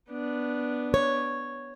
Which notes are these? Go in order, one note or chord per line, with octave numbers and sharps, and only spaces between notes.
B3 D4
C#5